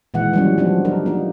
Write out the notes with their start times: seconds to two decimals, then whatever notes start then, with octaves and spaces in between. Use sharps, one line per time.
0.14 A#2 D#3 E3 G#3 F#5
0.33 E3 F#3 G3 B3 C#4
0.58 F3 F#3 B3 D4
0.85 D4 D#4 A#4
1.06 A#3 D#4